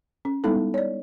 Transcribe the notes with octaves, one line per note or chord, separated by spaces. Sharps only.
C#4
G3 G#3 B3 D#4 E4 A4
C#5 D5